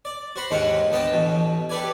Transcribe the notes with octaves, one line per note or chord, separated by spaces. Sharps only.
D5
F#4 C5 B5
D#2 G#2 D#3 F4 A#4 F#5
D2 B3 D#5 G5 A5
A1 B2
G4 A4 B4 D5 G#5